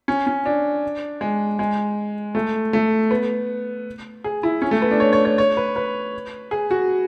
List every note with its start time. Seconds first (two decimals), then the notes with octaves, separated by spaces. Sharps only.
0.08 C#4
0.27 C#4
0.46 D4
1.21 G#3
1.59 G#3
2.35 A3
2.73 A3
3.11 B3
4.24 G#4
4.43 E4
4.62 C#4
4.71 A3
4.82 B3
4.91 D4
5.00 C#5
5.13 C#5
5.25 C#5
5.38 C#5
5.57 B4
5.76 B4
6.51 G#4
6.71 F#4